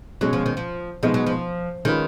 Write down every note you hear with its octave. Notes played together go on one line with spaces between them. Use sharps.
B2 F#3 G#3 C#4
F3
D#3
F3
B2 F3 G#3 B3 D#4
F#3
F3
D#3 G#3 C#4 F4 B4